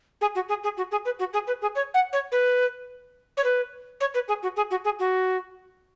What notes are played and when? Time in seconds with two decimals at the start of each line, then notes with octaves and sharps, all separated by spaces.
0.21 G#4
0.35 F#4
0.49 G#4
0.63 G#4
0.77 F#4
0.91 G#4
1.05 B4
1.19 F#4
1.33 G#4
1.47 B4
1.61 G#4
1.75 C#5
1.94 F#5
2.12 C#5
2.31 B4
3.37 C#5
3.44 B4
4.00 C#5
4.14 B4
4.28 G#4
4.42 F#4
4.56 G#4
4.70 F#4
4.84 G#4
4.99 F#4